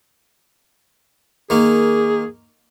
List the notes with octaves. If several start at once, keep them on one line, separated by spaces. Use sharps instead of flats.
D#3 A#3 G#4